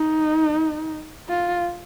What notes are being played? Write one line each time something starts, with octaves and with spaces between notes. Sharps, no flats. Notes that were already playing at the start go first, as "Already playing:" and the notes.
Already playing: D#4
F4